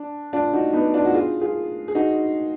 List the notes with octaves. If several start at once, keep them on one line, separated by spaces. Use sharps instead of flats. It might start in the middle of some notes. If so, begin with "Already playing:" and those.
Already playing: D4
D4 F4
D#4 F#4
B3 D#4
D4 F4
F#4
F4 G#4
F4 G#4
G#4
D#4 F#4